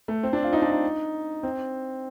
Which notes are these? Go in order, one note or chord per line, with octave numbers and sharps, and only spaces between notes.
A3
C4
D4
F4
D#4
D4
D#4
C4